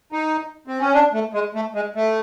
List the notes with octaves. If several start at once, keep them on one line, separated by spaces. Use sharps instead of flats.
D#4
C4
C#4
D4
A3
G#3
A3
G#3
A3